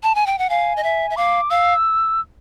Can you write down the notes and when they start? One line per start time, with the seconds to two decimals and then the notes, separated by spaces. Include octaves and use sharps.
0.03 A5
0.15 G#5
0.26 G5
0.39 F#5
0.50 F5 G#5
0.77 D#5
0.84 E5
1.10 E5
1.16 F5 D6
1.50 F5 E6